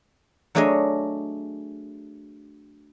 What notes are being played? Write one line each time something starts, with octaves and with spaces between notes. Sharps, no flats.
F#3 A3 D4 G#4 C#5 D#5